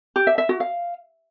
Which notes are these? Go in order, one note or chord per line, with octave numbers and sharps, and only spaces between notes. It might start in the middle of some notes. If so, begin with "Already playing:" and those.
G4
E5
E5
F#4
F5